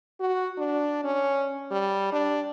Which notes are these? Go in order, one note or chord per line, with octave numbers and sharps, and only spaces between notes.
F#4
D4
C#4
G3
D4